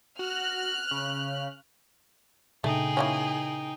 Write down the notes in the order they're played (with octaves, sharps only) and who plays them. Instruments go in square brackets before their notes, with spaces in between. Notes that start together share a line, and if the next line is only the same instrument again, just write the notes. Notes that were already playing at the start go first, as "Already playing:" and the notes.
[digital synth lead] F#4 [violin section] F6 F#6
[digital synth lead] C#3
[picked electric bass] A#2 C#3 D4 [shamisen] A3 [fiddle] D#4 G5 [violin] G#4
[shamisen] E3 A#3 C#4